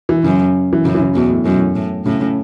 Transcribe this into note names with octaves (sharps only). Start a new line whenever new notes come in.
E3
F#2 C#3
E3
F#2 C#3
E3
C#3
E2 B2
A2
F#2 B2
A2
A2
A2 C#3
C#3